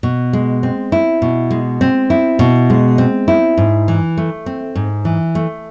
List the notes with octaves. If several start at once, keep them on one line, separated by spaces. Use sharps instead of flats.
B2
G#3
C4
E4
B2
G#3
C4
E4
B2
G#3
C4
E4
G#2
E3
A3
C4
G#2
E3
A3